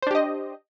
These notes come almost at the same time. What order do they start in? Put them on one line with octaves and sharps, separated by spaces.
C5 D4 G4 D#5